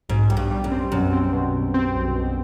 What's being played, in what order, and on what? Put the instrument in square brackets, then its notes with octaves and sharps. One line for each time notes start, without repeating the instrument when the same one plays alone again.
[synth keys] B1 [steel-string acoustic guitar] G#2
[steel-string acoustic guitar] G#2 [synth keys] G3
[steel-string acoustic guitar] G2
[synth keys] G3
[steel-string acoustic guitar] F#2
[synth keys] C4
[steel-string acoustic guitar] F#2 [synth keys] B2
[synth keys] C4
B2
B2
C4
B1
B2